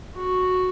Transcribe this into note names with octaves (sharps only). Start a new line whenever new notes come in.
F#4